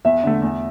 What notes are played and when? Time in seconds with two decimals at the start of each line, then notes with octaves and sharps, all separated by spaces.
0.05 E2 E5
0.24 D3 A3
0.42 E2